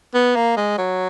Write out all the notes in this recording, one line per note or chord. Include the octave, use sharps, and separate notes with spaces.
B3
A#3
G#3
F#3